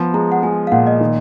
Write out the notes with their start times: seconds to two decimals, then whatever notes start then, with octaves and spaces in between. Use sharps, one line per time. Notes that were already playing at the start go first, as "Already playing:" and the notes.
Already playing: F3 B3
0.14 G#3 A#5
0.32 F#5
0.43 G#3 G#5
0.67 F5
0.72 A#2 F#5
0.87 D#5
1.00 D#3